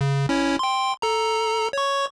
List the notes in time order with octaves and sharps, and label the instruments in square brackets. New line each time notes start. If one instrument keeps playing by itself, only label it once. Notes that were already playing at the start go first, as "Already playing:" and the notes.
[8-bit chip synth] C#3
C#4 E4 C#5
G5 C6
A4 A#5
C#5 C#6